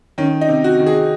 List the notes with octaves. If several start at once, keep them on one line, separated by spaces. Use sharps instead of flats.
D#3 C#4
D#4
C3
F#4
D#3
G#4